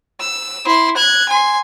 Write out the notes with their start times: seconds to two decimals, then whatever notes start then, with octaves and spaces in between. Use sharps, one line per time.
0.20 E6
0.66 E4 C6
0.97 F#6 G#6
1.29 G#5 C6